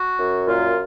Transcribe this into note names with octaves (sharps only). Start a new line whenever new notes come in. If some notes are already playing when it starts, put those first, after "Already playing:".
Already playing: F#4
F#2
A#2 F4